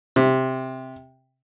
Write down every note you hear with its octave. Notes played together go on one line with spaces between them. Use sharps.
C3